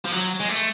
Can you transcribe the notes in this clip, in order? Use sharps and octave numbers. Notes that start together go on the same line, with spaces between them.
F3
F#3
G#3
A3